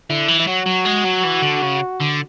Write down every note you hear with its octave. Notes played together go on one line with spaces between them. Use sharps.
D3 E4
E3
E4
F#3 F#4
F#3
G#3
F#3
E3
D3
C#3
D3